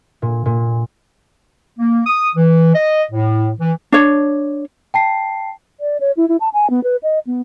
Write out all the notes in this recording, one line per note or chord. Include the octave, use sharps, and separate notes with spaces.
A#2
A#2
A#3
D#6
E3
D#5
A2
E3
D4 C#5
G5 A5 C7
D5
C#5
E4
E4
A5
G#5
B3
B4
D#5
B3